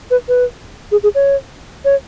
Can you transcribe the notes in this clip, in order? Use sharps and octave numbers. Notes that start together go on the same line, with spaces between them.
B4
B4
G#4
G#4
C#5
C#5